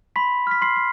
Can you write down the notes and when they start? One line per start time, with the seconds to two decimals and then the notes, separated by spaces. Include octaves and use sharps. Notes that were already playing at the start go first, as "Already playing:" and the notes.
0.16 B5 C6 B6
0.47 F6 B6
0.62 C6 C7
0.76 C6